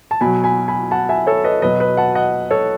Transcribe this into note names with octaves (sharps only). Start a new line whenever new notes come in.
A5
B2 F#3 G#5 B5
G#5 B5
G#5 B5
F#5 A5
E5 G#5
A4 C#5
B4 D#5
B2 F#3 B4 D#5
B4 D#5
F#5 A5
D#5 F#5
A4 C#5